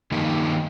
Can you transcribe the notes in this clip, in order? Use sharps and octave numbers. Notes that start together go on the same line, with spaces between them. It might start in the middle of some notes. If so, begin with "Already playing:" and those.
G2 D#3 A#3 D#4 G4